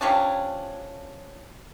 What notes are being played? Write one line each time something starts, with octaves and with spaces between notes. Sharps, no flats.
C3 F3 C#4 D4